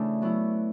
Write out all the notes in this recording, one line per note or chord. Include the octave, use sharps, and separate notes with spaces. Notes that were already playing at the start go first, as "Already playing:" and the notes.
Already playing: C#3 E3 A3 D4
F#3 B3 E4